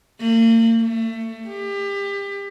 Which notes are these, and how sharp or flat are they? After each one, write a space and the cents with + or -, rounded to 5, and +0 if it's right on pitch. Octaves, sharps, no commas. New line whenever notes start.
A#3 -40
A3 +25
G4 +30